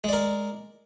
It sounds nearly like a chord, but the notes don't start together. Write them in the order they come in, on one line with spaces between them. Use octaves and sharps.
G#3 D5 A#4